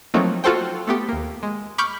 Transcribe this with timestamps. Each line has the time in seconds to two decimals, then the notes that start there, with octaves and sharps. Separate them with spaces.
0.14 F3 F#3 A3 A#3 C4 D#4
0.44 F4 F#4 A4 C5 G5
0.87 A3 B3 G4
1.09 D#2 A#3
1.43 G#3
1.78 B5 C#6 D6 F6 G6